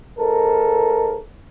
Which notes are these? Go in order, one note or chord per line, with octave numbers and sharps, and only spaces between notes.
G#2 A4 A#4